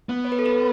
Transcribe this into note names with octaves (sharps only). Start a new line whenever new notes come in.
B3
C#5
B4
A4
B4